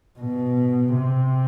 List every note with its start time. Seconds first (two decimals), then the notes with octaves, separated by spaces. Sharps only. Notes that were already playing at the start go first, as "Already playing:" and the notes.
0.20 B2
0.96 C3